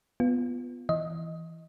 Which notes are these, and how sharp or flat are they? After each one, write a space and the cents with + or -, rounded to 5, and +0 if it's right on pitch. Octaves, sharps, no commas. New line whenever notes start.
B3 +0 F4 +0
E3 +0 D#5 +10